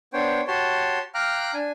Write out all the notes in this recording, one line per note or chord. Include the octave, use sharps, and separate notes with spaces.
B3 D4 C5 C#5 G5
F#4 G4 C#5 A5 C6
F5 G5 A#5 D6 F6 F#6
D4 G#5